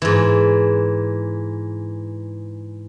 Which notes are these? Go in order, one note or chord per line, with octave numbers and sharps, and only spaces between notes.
G#2 E3